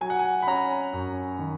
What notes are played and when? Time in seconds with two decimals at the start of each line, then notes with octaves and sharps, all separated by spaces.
0.01 F#3 G#5
0.10 F#5
0.19 G#5
0.42 B5
0.47 C#4 A#5
0.93 F#2
1.39 D#3